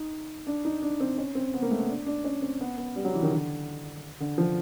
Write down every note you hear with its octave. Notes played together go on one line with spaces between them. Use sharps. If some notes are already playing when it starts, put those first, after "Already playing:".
Already playing: D#4
D4
D#4
D4
C4
C#4
C4
B3
A#3
A3
B3
D4
D4
C#4
C4
B3
B3
G3
F#3
E3
D#3
D3
D3
F3